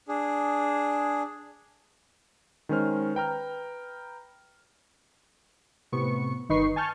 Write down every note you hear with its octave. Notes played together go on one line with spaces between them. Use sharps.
D4 G#4
D#3 G#3 C#4 C5 F6
B4 G5 A#5 F6
A2 C3 B3 C#6 C#7
G1 D#3 D#4 B4 C#6 C7
G#5 A5 C#6 F6 G6